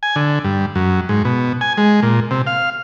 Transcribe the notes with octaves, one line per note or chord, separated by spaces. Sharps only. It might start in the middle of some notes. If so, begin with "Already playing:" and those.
G#5
D3
G2
F#2
G#2
B2
G#5
G#3
A#2
C3
F5